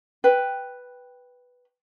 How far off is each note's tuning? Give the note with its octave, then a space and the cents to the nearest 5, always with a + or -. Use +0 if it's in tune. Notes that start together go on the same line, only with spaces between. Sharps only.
B4 +0 G5 +0